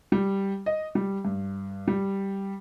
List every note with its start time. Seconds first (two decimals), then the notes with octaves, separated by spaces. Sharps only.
0.12 G3
0.66 D#5
0.95 G3
1.25 G2
1.88 G3